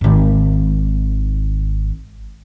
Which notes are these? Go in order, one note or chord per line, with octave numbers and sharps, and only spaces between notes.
G#1 D#3